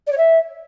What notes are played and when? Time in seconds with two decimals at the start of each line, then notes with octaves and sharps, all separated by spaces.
0.07 D5
0.12 C#5
0.17 E5